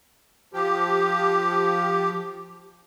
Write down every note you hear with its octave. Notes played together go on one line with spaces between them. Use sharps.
F3 G4